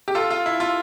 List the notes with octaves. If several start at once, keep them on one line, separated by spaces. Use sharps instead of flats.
G4
F4 A4
F4
E4
F4